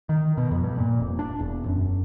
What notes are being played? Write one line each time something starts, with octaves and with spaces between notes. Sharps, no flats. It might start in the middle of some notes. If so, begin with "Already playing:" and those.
D#3
B2
F2
G2
A#2
F1
D4
E1
F#2